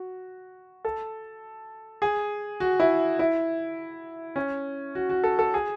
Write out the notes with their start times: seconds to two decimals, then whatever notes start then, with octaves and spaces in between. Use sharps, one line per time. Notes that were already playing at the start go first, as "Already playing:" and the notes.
Already playing: F#4
0.85 A4
2.02 G#4
2.60 F#4
2.80 E4
3.19 E4
4.36 C#4
4.95 F#4
5.10 F#4
5.24 A4
5.39 A4
5.54 G#4